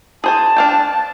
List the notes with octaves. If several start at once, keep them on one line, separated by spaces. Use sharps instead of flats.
G#4 C5 G#5 A5
D4 F5 G5